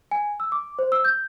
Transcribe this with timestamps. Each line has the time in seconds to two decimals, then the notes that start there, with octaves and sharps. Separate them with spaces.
0.11 G#5
0.40 E6
0.52 D6
0.79 C5
0.92 E6
1.04 G6